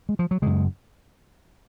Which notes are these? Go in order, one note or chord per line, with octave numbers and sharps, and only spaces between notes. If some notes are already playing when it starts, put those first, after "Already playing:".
G#3
F3
F#3
F#2 C#3 G#3